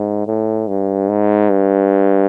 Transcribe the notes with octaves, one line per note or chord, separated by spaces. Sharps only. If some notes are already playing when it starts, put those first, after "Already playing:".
Already playing: G#2
A2
G2
G#2
G2